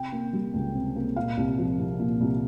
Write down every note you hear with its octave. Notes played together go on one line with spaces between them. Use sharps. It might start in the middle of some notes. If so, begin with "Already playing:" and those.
Already playing: C3 G5
A#3
G3
C#2
C3
A#3
A#2 F5
C2
F3
C2
A#2
C2